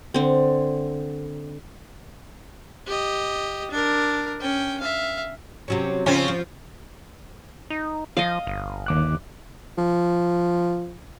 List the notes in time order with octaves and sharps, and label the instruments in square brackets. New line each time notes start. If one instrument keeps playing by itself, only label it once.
[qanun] D3 C4
[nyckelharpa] G4 D#5
D4 A#4
C#4 G5
E5 F5
[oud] C3 F#3 C#4
[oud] C#3 F3 [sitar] C4 C#4 F4
[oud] F3
[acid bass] D#4
[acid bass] F3 [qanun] D#5 F5
[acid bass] G1
[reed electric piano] D#2 D6 F#6
[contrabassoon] F3